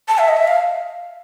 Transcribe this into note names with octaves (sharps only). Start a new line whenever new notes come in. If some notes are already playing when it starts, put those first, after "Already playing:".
A5
E5
D#5
E5
F5